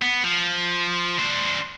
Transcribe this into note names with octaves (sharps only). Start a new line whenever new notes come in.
B3
F3
D4 C5